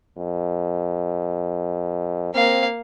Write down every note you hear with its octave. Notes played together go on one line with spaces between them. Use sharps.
F2
A#3 C4 F5